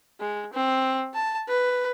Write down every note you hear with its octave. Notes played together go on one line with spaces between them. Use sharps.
G#3
C4
A5
B4